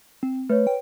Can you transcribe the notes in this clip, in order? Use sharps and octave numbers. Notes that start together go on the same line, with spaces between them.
C4
A3 B4 C#5
G5